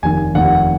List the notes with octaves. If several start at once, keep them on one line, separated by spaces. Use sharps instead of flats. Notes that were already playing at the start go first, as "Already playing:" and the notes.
F1 D#2 D#3 G#5
F1 D#2 D#3 F#5